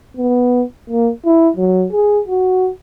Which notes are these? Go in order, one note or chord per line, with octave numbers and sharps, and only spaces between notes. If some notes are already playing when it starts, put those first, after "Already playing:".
B3
A#3
E4
F#3
G#4
F#4